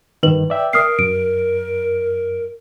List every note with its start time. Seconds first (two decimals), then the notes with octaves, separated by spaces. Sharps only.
0.23 G2 D#3 B4 F#7
0.50 D5 E5 G5
0.73 A#4 D#6 F6 C7
0.99 F#2 D7